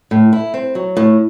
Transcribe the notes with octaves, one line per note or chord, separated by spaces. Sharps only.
A2
E4
C4
F#3
A2